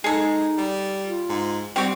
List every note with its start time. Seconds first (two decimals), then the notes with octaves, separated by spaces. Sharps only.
0.04 G#3 D#4 G#4 A4
0.57 G3
1.05 F4
1.29 G#2
1.76 G3 C4 F#4 G4